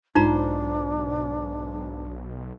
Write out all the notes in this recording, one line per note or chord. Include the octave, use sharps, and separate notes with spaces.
B1 G#2 D4 D#4 F4 C5 A#5